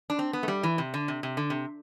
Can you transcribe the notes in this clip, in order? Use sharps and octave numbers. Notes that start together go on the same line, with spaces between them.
D4
C4
B3
A3
G3
E3
C3
D3
C3
C3
D3
C3